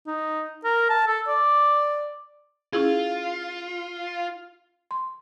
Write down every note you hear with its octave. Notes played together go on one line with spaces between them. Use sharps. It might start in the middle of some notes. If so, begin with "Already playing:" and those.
D#4
A#4
A5
A4
D5
C#4 E4 F4 G#4
C6